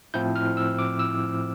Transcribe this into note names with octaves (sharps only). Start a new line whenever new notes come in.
A2 F3 C4 E4 G6
F6
E6
D6
E6